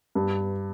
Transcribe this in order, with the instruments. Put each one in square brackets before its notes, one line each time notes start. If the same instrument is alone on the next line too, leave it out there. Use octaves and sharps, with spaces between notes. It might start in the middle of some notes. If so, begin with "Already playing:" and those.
[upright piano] G2